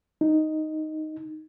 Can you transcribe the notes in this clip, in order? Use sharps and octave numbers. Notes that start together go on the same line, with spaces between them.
D#4